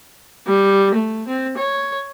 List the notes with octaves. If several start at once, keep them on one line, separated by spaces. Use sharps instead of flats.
G3
A3
C4
C#5